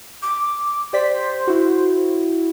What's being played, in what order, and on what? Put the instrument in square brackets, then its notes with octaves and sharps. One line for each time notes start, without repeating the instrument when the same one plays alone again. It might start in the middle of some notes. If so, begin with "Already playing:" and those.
[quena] D6
[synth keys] G4 D5 B6 [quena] C5
[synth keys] E4 F#4